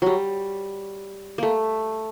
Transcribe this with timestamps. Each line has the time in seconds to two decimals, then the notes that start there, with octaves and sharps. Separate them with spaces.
0.02 F#3 G3
1.38 A3 A#3